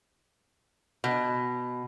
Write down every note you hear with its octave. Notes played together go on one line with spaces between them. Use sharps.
B2